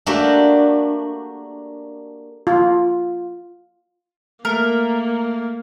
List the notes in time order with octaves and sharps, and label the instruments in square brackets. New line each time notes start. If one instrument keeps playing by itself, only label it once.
[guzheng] A3 A#3 D4 F#4 G4
[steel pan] F4
[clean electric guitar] A3 [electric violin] A#3 [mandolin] A#4